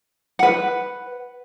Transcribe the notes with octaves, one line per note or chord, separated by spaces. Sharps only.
B4 F#5